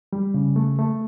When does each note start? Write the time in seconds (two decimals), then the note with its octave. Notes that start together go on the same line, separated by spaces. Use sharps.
0.13 G3
0.34 C#3
0.56 A3
0.79 A3